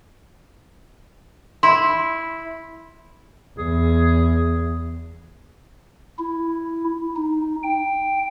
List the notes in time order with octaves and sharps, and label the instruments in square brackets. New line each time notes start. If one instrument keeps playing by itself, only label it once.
[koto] E4 [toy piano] C6
[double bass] E2 [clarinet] G#4
[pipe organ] E4
D#4
G5